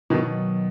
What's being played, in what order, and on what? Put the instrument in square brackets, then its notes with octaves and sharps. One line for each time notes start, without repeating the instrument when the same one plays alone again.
[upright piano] B2 D#3 [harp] F#3 D#4 F#4